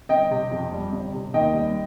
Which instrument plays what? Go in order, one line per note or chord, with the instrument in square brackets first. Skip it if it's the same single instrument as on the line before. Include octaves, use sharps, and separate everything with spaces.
[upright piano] G1 D#5 G5
C3
F2
G3
G1
C3
D#2 D#5 G5
G3